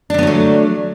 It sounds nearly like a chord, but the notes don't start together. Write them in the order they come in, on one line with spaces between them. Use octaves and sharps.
D4 D3 B3 F#3 A3